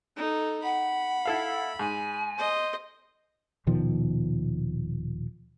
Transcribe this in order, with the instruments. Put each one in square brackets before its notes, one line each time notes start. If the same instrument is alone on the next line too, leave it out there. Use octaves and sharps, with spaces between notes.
[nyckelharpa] D#4 A4
[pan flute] F#5 [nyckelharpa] B5
[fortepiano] E4 A4 F5
[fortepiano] G#2 [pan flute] G#5
[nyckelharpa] C5 D#5
[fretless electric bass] D#1 B2 D#3 F3